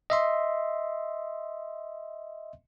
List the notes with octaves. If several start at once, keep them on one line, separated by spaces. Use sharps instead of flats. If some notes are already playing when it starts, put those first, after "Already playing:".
D#5 E5 C6